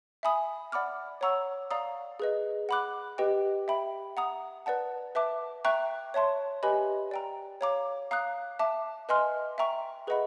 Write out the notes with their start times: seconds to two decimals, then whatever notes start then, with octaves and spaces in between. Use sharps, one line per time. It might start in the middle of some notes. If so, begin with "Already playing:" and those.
0.23 E5 G#5 B5 D#6
0.72 D5 F#5 B5 D6 F6
1.21 C#5 F#5 A#5 C#6 E6
1.71 D5 F5 A#5 D#6
2.20 G#4 B4 D#5
2.69 F#5 B5 D6 F#6
3.18 G4 B4 D#5 G5
3.68 E5 G5 B5
4.17 F#5 A#5 D#6
4.66 B4 D5 F#5 A5
5.15 B4 E5 A5 D6
5.65 E5 G5 A#5 C#6 F#6
6.14 C#5 E5 A5 C6
6.63 G4 B4 D#5 G#5 B5
7.11 D5 G5 A#5
7.61 C#5 F5 A#5 D6
8.11 F5 A#5 D#6 F#6
8.59 E5 A5 D6
9.09 B4 D#5 G#5 C6 F6
9.58 E5 G5 A#5 C#6
10.07 G#4 B4 D#5 F#5 B5